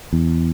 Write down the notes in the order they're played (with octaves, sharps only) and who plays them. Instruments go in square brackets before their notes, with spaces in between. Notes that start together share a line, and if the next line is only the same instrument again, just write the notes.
[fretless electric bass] E2